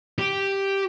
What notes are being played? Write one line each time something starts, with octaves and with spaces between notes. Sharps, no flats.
G4